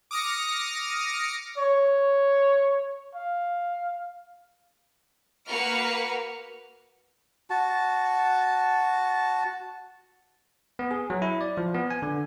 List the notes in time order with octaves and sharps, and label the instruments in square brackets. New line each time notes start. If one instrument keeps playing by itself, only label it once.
[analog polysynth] D6 D#6 F6 A#6 C#7
[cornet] C#5
F5
[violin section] A#3 F#4 B4 F6 C#7
[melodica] F#4 A5
[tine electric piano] B3
G#4
F#3
E4
D5
F3
B3
G#5
D3